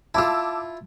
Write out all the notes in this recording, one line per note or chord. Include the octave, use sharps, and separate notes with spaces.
E4 F4 A5 D6 E6